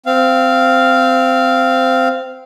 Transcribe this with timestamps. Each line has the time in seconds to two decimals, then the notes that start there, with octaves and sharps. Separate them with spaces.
0.06 C4 F5